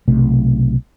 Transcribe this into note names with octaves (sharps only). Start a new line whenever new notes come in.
B1 C3 A3